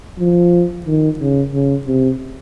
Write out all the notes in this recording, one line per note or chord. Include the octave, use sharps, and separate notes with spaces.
F3
D#3
C#3
C#3
C3